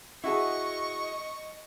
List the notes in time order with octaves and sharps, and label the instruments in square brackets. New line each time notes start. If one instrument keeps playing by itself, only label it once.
[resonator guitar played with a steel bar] E4 F#4 G#4 [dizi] D#5 [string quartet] C#6